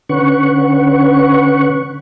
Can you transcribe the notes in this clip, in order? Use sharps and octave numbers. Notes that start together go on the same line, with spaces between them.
D3 C#4 B4 F#5 C#6